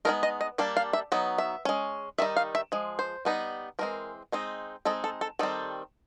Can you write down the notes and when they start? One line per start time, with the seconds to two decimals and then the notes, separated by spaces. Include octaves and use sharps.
0.05 G#3 B3 D#4 A#4
0.23 D#5
0.41 D#5
0.58 G3 A#3 D4 F5
0.77 F5
0.93 E5
1.12 F#3 B3 D#4
1.38 E5
1.65 G#3 C#4
2.18 D#3 G3 D#4 E5
2.36 F5
2.55 E5
2.72 F3 G#3
2.99 C5
3.25 G3 B3 D#4
3.79 E3 G#3 C4 A#4
4.32 G#3 C4 D#4
4.85 G#3 C4 D#4 A4
5.04 A4
5.21 A4
5.39 D#3 G3 C4 A4